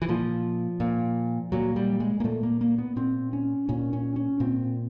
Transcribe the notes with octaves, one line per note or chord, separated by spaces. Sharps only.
E3
A#2 F3
A#2
A#2 F#3
G3
G#3
A#3
A#2 A3
A#3
A#3
B3
A#2 C4
C#4
A#2 C#4
C#4
C#4
A#2 C4